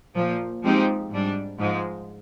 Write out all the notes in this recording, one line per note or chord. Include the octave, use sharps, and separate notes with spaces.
A#2 F3 A#3
F3 G#3 C4 D#4 G4
G#2 G3 D4
G#2 F3 G#3